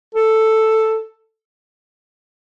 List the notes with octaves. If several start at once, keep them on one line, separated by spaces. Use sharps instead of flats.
A4